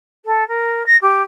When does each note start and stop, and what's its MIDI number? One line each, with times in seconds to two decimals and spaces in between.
0.25 0.47 69
0.48 0.85 70
0.86 0.96 94
1.02 1.22 67